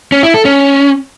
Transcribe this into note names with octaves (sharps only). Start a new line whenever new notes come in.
C#4
E4
A4
C#4